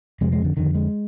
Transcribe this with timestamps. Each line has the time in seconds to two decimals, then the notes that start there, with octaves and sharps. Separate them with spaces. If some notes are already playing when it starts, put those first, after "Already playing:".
0.21 F2 C3 G#3
0.33 G#3
0.44 D3
0.57 F2 D3 D#3
0.75 G#3